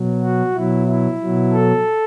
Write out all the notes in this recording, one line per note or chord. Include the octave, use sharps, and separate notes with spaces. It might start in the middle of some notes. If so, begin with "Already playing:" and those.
Already playing: B2 F#3
F#4
B2 F#3 E4
E4
B2 F#3
A4